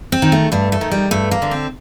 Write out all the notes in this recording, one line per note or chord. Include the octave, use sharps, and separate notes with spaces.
C4
D#3
A3
G2 A3
A3
D#3
G3
G2 A3
A#3
D3
C4